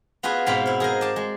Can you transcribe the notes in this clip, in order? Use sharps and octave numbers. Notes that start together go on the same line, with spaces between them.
B3 F4 F#4 G#4 B4
G#2 B2 B3 C4 F5 B5
E4 F5
G#4 A#4 C5 D#5
D5 A5
G#3